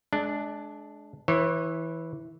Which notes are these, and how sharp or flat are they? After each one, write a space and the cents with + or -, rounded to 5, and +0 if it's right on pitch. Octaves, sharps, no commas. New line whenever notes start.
G#3 +30 D4 +0
E3 -10 C#5 -40